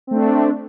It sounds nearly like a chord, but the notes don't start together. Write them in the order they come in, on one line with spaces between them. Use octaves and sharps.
C4 A3 D4